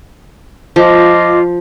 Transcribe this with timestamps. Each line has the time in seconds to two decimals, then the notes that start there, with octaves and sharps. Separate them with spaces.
0.76 F3 F4 D#5 D6